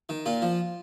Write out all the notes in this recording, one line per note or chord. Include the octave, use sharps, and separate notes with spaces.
D#3
A#2 F4
F3